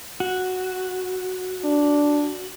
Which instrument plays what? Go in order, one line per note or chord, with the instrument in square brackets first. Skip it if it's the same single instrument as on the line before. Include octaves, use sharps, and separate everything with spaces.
[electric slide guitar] F#4
[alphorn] D4